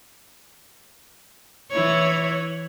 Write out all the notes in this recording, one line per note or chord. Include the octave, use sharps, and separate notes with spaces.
E3 E4 C#5